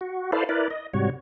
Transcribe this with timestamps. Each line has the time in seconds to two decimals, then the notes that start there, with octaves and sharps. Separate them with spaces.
0.01 F#4
0.32 E4 A4 B4 C5 D5 F5
0.49 E4 A#4 B4 D5
0.70 D#5
0.93 G#2 C3 G3 F#4 C#5